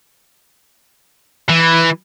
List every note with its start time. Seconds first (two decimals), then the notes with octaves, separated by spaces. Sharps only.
1.49 E3